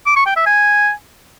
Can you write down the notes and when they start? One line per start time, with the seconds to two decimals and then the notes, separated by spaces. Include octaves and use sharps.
0.06 D6
0.16 C#6
0.26 G5
0.36 E5
0.46 G#5